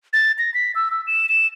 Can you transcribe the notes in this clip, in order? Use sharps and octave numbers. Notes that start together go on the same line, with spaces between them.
A6
A#6
B6
E6
E6
E7
E7